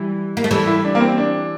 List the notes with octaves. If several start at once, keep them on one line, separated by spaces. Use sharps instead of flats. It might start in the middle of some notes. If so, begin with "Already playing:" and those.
Already playing: E3 G3
A#3
A3
E3 G3 A4
E4
D4
A#3
C4
D4